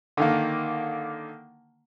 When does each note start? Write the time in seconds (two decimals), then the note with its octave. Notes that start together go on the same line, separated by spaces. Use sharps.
0.17 D3 D#3 A#3